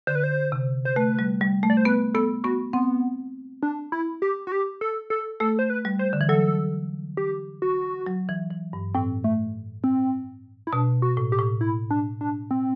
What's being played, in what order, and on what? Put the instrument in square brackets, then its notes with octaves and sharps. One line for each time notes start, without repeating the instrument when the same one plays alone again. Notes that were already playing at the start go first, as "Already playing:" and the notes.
[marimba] D3 [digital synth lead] C5
[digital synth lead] B4
C5
[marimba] C3
[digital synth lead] C5
[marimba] A3 [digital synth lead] B4
[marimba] G3
G3
A3
[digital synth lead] D5
C5
[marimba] B3 [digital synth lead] B4
[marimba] B3 [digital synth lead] A4
[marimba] B3 [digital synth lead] F#4
[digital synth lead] B3 [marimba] C4
[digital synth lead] D4
E4
G4
F#4
G4
A4
A4
[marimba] A3 [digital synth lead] A4
[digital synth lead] C5
B4
[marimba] G3
[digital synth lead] C5
[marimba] D3
E3
[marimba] F#3 [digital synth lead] A4
[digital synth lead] G4
F#4
[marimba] F#3
E3
E3
G2
[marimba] A2 [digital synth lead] C4
[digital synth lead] A3
C4
E4
[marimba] B2 [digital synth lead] D4
[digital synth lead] F#4
[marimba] A2
[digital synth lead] G4
[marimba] A2
[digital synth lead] E4
D4
D4
C4